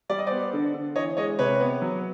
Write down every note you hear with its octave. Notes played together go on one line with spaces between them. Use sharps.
G3 D5
D#5
B3 C5 D5
D3
D3
E3 C#5 D#5
G#3 C#5 D#5
C3 B4 C#5
B3
F#3